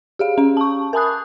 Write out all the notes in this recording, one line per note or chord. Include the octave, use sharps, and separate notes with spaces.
G4 G#4 F5
C#4 F5
A5 C#6
A#4 G#5 A5 B5 D#6 F#6